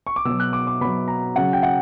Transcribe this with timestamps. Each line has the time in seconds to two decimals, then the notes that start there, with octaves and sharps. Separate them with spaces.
0.07 C#6
0.16 D6
0.25 B2 E6
0.30 F#3
0.40 F#6
0.53 D6
0.67 D6
0.81 B2 F#3 B5
1.08 A#5
1.36 C#3 F#3 F#5
1.53 G5
1.63 F#5